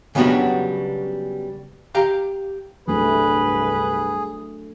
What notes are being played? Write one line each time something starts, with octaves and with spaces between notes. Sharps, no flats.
C#3 F#3 G3 B3 D4 F#4
G4 F5 A#5
C2 G2 F#3 A3 D4 G#4 B4